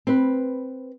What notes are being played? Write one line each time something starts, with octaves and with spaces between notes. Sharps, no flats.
C4 B4